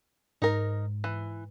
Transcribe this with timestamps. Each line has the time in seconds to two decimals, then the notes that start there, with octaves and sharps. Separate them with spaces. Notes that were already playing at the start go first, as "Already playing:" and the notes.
0.42 G#2 D#4 A#4
1.04 E3